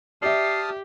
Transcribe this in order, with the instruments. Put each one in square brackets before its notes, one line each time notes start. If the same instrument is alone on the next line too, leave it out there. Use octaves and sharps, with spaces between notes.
[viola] G4 [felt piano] D5 E5 [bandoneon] A5 D#6 F6 [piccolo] C7